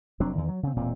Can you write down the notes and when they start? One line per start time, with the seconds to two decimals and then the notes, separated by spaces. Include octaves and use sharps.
0.20 F1 F#3 C4 D4
0.35 E2 D#3
0.49 F#3
0.63 C#3 C4
0.76 E1 A#2 C4